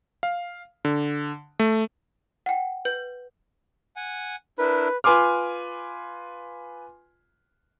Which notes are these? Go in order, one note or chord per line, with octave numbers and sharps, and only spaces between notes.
F5
D3
A3
F#5 G5
B4 G6
F#5 G#5
D4 E4 A#4 B4
F4 B4 G#5 C6 D6 F6